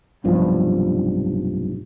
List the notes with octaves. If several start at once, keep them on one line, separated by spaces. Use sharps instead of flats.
F1 B1 G2 F3